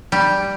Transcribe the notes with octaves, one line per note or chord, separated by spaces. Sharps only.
G3